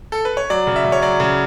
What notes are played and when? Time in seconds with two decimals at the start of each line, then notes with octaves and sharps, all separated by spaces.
0.12 A4
0.25 B4
0.37 C#5
0.50 F#3 D5
0.67 C#3
0.76 E5
0.85 C#3
0.92 C#5
1.02 F#3 D5
1.20 C#3